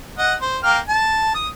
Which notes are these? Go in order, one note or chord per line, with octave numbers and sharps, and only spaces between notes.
D#5 F#5
C5
A#3 G5 F6
A5
D#6